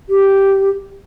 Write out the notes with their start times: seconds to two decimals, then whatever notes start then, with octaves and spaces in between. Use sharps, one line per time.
0.09 G4